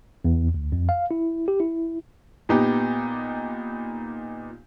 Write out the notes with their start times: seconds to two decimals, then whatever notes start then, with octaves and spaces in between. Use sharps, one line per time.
0.25 E2
0.54 D2
0.72 F2
0.89 F5
1.11 E4
1.48 G4
1.60 E4
2.49 A#2 B3 D#4 G4